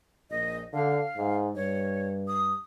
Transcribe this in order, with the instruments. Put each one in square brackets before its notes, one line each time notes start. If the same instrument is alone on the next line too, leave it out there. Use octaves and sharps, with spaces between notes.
[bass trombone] A#1 [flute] D#5
[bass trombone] D3 [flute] F5
[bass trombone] G#2
[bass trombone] G2 [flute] C#5
[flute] D#6